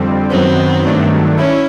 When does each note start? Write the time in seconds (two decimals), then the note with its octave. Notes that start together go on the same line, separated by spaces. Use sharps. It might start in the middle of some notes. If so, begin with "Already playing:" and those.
Already playing: F2 D3 G3 C4
0.30 F#2 D#3 F#3 B3 C4
0.85 G2 D#3 F#3 A3 D4
1.37 C#4 E4